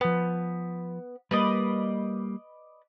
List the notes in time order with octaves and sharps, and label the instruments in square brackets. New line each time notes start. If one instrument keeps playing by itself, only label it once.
[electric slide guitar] F3 B4 [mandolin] B3
[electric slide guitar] G3 A#3 [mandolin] B4 D5 D#5